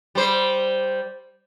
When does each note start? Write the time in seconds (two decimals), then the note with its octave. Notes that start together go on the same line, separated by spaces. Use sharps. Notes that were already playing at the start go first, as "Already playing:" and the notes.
0.15 G3 C5